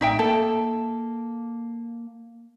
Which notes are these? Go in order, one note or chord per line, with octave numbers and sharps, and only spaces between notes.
A#1 A2 D#4 E5 G5
A#3 A4